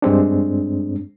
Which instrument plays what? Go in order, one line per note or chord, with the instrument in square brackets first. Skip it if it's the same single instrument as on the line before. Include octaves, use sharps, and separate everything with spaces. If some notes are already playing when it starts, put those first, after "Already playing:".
[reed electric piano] G2 G#3 C4 D4